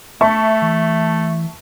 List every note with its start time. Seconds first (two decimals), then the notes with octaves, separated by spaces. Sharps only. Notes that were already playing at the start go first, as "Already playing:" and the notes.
0.21 A3 E5 A5 C#6
0.62 E3